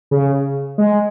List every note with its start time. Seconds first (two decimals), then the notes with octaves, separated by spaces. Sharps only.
0.11 C#3
0.78 G#3